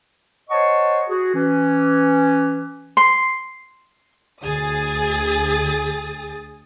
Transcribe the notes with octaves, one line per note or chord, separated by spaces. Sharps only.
C5 C#5 D#5 F#5 A5 C#6
F#4 G#4
E3 C#4
C6
D2 G#4 D#6 A6